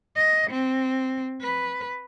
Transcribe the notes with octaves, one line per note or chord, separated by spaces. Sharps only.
D#5
C4
B4